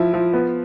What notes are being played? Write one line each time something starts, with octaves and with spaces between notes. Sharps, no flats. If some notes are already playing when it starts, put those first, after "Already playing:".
Already playing: F3 E4
F3
B3